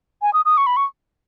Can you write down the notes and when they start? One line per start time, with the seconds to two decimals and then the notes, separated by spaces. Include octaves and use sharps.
0.22 G#5
0.33 D#6
0.45 D#6
0.57 C#6
0.67 B5
0.77 C#6